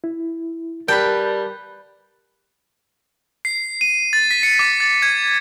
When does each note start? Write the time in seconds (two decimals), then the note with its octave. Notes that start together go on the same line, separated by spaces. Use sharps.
0.04 E4
0.88 G3 A#4 B4 G5 A5
3.45 C7
3.81 D#7
4.13 A6
4.31 B6
4.43 C#7
4.59 D6
4.80 A6
5.02 G#6